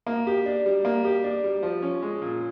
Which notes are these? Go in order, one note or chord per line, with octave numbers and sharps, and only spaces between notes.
A#3
G4
D4
G3
A#3
G4
D4
G3
F3
C#4
G#3
A#2